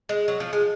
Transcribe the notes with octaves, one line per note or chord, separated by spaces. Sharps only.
G#3
F#3
F3
G#3